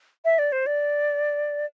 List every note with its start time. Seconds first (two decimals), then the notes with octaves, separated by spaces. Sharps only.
0.25 E5
0.39 D5
0.52 C5
0.66 D5